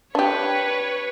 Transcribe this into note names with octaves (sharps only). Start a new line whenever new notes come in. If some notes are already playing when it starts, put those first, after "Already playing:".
D4 G4 B4 C#5